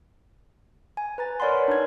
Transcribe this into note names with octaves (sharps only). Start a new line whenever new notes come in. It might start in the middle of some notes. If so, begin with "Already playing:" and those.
G#5
B4 A#5 A6
A#4 C#5 D5 F#5 B5 C6
D4 D#4 G#6